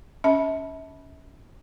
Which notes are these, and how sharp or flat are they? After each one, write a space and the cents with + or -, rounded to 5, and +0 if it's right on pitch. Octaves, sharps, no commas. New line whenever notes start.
C#4 +15 E5 -40 A5 +0